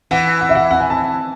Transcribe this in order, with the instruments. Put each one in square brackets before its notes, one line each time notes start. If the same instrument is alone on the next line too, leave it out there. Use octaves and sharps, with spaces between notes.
[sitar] E3 [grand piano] F#5
[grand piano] F#5
E5
F#5
F#5
G#5
A5